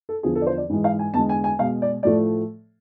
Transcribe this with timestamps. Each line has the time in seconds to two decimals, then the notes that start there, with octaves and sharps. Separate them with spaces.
0.09 A4
0.23 E2 D3 F3 G#4
0.35 A4
0.42 D5
0.47 C5
0.58 D5
0.69 G#2 E3 G#3
0.84 F5
0.99 G#5
1.14 E2 D3 G#3 A5
1.29 G#5
1.44 G#5
1.59 B2 G#3 F5
1.82 D5
2.03 A2 F3 A3 D5